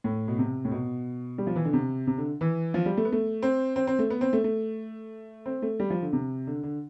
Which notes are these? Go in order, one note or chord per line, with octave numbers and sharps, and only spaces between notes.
A2
B2
C3
A2
B2
G3
F3
E3
D3
C3
C3
D3
E3
F3
G3
A3
B3
A3
C4
C4
C4
A3
B3
C4
A3
A3
C4
A3
G3
F3
D3
C3
D3
D3